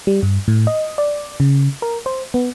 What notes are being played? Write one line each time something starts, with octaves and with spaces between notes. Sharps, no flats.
G3
G2
A2
D#5
D5
C#3
A#4
C5
B3